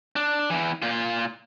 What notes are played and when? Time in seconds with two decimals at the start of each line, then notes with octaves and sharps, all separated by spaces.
0.16 D4
0.50 E2 E3
0.82 A#2 F4